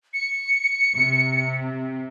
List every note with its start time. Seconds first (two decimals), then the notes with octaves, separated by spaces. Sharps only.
0.14 C#7
0.95 C3